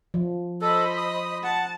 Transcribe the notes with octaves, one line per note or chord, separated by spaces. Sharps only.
F3
A4 C5 D#5 B5
D#6
F#5 A5